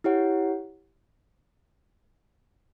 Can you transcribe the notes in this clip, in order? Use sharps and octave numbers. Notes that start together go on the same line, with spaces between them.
E4 G4 C#5 F#5